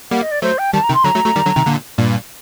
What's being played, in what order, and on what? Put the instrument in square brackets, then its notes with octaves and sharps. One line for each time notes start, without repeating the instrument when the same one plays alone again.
[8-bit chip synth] G3 A#3 [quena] F#5
[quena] D#5
D5
[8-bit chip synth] F#3 A3 [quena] C5
[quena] G5
[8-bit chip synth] D#3 G3 [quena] A5
[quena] A#5
[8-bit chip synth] C3 D#3
[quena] C6
[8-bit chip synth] D3 F#3 [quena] A#5
[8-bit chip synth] F#3 A3
F#3 A3
D#3 G3
D3 F#3
C3 D#3
A#2 D3
G2 A#2